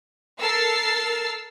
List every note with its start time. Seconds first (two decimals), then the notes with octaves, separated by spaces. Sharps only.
0.39 A4 A#4 E6 F6 A6 C7